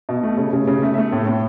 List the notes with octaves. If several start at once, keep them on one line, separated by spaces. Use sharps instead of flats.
B2
A3
C#3
C#3
C#3
A3 E5
E5
A3
A2
A2